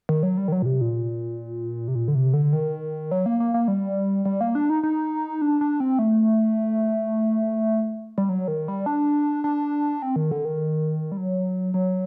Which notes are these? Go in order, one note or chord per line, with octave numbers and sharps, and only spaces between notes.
D#3
F#3
G3
D#3
F#3
A#2
C3
A#2
C3
A#2
D3
C3
D3
D#3
F#3
A#3
A#3
A#3
G3
G3
A#3
D4
D#4
D#4
D4
D4
C4
A3
G3
F#3
D#3
G3
D4
D4
C4
D#3
D3
D#3
G3
F#3
F#3